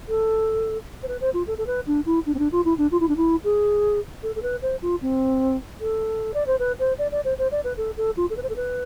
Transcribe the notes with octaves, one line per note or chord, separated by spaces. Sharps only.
A4
C5
B4
C5
F4
A4
A4
B4
D4
E4
D4
C4
D4
F4
E4
D4
F4
E4
D4
E4
G#4
A4
A4
B4
C5
F4
C4
A4
D5
C5
B4
C5
D5
D5
C5
C5
D5
B4
A4
A4
F4
A4
B4
C5
A4
B4